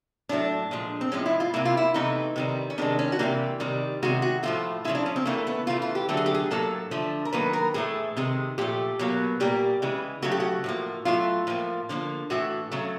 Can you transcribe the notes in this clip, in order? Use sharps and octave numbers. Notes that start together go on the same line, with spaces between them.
A2 F#3 A3 D4
A#2 F3 G#3
C4
A2 F3 G#3 C#4
E4
F4
C3 E3 G3 A#3 E4
F4
E4
C3 E3 A3 D#4
C3 D#3 G3
C#4
C3 D#3 G#3 D4
C#4
F#4
C3 E3 G3 A#3 G4
C3 D#3 G3
C3 D#3 G#3 F#4
F#4
A2 F3 A3 F4
C#3 F3 G#3 E4
D4
C#4
C4
C#3 E3 A3 A#3
B3
C#3 E3 A3 F4
F4
G4
D3 F#3 A3 A4
G#4
G4
G#4
A2 F#3 A#3 A4
D3 F3 A3
A#4
D#3 F#3 A#3 B4
A#4
A2 E3 A3 G#4
C3 D#3 G#3
A#2 F3 A3 G4
B2 F#3 A#3
A#2 G3 A#3 G4
C#3 E3 G#3
C#3 F#3 A3 F#4
G4
F#4
A2 F3 A#3
A2 F#3 A3 F4
A2 F3 A#3
D3 F3 A#3
A2 E3 A3 F#4
C#3 F#3 A3